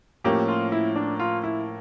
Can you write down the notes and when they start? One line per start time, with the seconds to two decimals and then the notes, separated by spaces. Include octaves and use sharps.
0.24 A2 F3 A#3 C#4 G4
0.48 F4
0.72 E4
0.96 D4
1.20 F4
1.43 E4